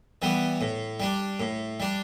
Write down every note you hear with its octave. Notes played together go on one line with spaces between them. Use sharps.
E3 G3 B3
A2
G3 D4
A2
G3 D4